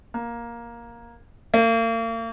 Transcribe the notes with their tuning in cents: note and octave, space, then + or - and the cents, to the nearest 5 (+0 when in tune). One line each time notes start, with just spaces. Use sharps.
A#3 +10
A#3 -40